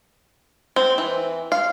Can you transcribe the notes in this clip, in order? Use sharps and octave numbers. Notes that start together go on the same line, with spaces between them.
C4
E3
F5